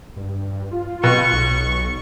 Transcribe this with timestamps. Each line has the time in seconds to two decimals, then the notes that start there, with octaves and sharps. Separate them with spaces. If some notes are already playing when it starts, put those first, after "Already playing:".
0.16 G2
0.71 F4
1.04 B2 C#6
1.33 B1